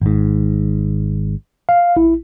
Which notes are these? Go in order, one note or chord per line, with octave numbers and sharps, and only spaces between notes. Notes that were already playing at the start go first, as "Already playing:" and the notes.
G#1 G#2
F5
A1 E4